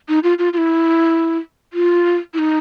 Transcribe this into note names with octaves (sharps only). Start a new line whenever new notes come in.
D#4
F4
F4
F4
E4
F4
E4
D#4